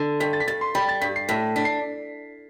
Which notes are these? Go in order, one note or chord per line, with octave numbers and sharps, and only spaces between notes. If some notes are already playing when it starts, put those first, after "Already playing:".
Already playing: D3
G2 B6
A6
B6
G2 A6
C6
G3 B5
A6
G2 B6
C7
A2 B6
D4 B6
C7